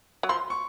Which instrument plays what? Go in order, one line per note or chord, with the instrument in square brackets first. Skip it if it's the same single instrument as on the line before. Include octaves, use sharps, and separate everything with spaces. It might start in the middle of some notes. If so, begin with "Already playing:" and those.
[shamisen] F#3
[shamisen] F3 [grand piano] C6
[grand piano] C#6